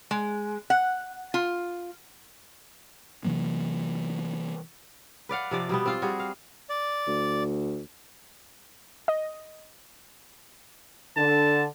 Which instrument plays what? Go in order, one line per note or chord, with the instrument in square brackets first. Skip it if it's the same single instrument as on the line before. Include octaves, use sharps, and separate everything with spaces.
[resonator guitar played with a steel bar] G#3
F#5
F4
[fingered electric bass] C3 E3 F#3 A#3
[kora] B4 D5 F5 F#5
C3 F3 D5
B2 G3 B3
C4 F4 F5
G3 F#4 G#4
F5
[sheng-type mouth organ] D5
[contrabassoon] D2
[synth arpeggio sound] D#5
[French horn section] D3 [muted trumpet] A5